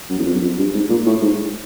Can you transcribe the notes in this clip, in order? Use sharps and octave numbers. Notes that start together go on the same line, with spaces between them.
F#2
E2
F2
F#2
F2
G2
G#2
A#2
A2
G#2